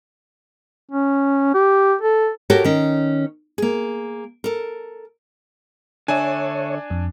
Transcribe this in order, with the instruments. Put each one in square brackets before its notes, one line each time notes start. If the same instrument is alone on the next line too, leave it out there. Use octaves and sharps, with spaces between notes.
[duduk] C#4
G4
A4
[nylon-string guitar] F#4 G4 A4 A#4 C#5
D#3 C#4
A#3 G#4
A4 A#4
[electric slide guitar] D3 E5 [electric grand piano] D4 G#5 [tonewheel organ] C#5
[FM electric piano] F2